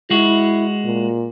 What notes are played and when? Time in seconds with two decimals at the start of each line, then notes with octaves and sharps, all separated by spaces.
0.10 G#3 E4 F#4
0.84 A#2